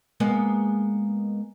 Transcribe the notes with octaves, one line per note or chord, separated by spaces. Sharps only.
G#3 A#3 B3